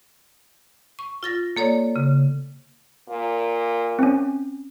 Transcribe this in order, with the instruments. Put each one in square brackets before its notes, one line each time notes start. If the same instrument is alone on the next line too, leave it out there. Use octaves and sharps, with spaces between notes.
[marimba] C#6
F4 A6 A#6
A#3 A4 C#5 D5
C#3
[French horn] A#2
[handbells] C4 C#4